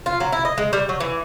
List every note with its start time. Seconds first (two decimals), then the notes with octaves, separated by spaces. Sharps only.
0.06 F4
0.20 F#3
0.32 E4
0.45 D#5
0.58 G#3
0.73 G3
0.89 F#3
1.00 E3